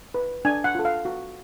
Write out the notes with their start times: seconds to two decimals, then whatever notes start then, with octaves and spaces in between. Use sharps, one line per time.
0.14 B4
0.45 D4 G#5
0.64 F#5
0.75 F4 A4
0.85 F5
1.05 F#4